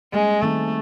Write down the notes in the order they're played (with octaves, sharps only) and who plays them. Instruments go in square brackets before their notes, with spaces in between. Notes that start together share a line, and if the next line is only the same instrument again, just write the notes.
[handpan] G3 A#3 C#4 [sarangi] G#3
[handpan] D#3 G3 C4 D#4 [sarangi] A3